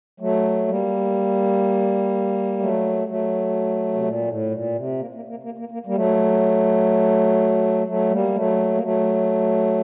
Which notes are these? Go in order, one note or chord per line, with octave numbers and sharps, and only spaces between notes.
F#3 A3
G3 A#3
F#3 A3
F#3 A3
C3
A#2
A2
A#2
C3
A#3
A#3
A#3
A#3
A#3
A#3
G3 A#3
F#3 A3
F#3 A3
G3 A#3
F#3 A3
A#3
F#3 A3